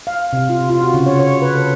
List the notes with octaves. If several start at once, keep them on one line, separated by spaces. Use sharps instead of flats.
F5
C3
F4
F4
F#4
C#3
C#5
C#5
B4
A4